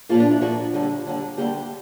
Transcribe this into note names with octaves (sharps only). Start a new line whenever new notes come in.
A#2 F3 A#3 F4
D4
E4
A#2 F3 A#3 F#4
D#2 D3 G3
D#2 D3 G3
D2 D3 G3 A#3 G4